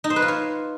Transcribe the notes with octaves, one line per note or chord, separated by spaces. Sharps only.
D#4
C5
B4
F4
C#5